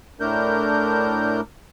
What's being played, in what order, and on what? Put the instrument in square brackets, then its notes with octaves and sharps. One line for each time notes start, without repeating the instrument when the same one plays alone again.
[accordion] A2 A3 D4 A#4 G6